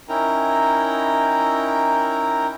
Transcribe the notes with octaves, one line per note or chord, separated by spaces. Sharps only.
C#4 D#4 E4 A#4 G5 A#5